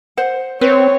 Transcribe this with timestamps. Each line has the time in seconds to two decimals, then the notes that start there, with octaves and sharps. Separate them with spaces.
0.17 C5 F#5
0.61 C4 B4 C#5